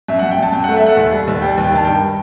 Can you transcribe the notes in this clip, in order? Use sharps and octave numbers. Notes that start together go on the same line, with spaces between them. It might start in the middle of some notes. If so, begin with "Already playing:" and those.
F#2 E5
F#5
F#2
G5
F#2 A5
F#2 G5
F#5
A3
E5
A3 F#5
D#2
G3
D#2
G3 G5
D#2
G5
D#3 A5
G2 G5